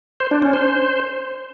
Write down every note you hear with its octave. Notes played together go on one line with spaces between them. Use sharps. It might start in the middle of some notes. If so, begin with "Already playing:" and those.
C5
D4
C#4
C5